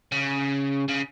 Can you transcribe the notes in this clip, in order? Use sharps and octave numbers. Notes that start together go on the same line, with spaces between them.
C#3
C#3